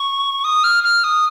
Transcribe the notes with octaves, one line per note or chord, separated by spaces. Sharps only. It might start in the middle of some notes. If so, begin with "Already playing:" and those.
Already playing: C#6
D#6
F6
F6
D#6